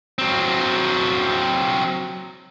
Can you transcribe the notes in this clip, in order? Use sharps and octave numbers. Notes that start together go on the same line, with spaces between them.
F#3 C4